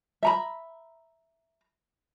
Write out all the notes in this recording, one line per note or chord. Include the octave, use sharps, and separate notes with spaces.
E5 A#5 B5